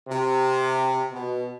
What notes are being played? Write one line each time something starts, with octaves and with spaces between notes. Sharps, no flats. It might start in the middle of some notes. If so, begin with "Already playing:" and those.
C3
B2